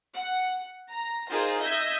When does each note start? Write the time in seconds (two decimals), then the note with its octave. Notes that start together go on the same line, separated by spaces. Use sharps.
0.14 F#5
0.90 A#5
1.30 D#4 F4 G#4 A#4 C5
1.61 D#5 E5 G6 G#6